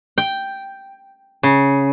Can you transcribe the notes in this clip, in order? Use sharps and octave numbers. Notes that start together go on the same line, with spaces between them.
G5
C#3